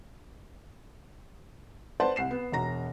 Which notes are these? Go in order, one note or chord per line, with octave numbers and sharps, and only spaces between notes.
B4 C5 D5 F#5 A5 C6
C2 C7 E7
B3
E1 B2 A#5 A#6